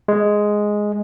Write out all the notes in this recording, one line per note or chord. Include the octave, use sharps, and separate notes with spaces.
G#3